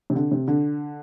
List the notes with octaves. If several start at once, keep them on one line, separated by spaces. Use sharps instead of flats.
C3
D3
C3
D3